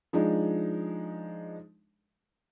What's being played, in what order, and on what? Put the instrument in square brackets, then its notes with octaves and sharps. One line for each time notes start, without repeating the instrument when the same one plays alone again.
[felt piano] F3 G#3 D4 D#4